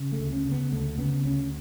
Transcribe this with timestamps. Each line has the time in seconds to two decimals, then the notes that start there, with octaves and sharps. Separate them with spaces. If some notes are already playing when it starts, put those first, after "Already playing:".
Already playing: C#3
0.12 A3
0.19 D2
0.32 C#4
0.45 C#3
0.51 B3
0.72 D2 A3
0.98 C#3 B3
1.24 D2 C#4